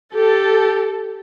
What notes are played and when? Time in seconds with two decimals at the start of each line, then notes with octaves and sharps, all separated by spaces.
0.14 G4 A4